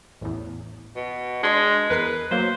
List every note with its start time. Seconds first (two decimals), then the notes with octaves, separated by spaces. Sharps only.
0.21 A1 E2
0.96 B2
1.43 G#3 D4 C6
1.90 E2 A#4 B4 C7
2.31 F#3 A#3 C5